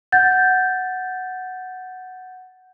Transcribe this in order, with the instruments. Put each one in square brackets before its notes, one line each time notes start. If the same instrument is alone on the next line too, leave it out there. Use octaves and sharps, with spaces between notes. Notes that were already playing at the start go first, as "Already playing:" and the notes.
[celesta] F#5 G6 A6